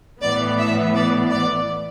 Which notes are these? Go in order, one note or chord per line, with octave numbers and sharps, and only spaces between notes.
A2 E3 B3 D5
E5
D5
D5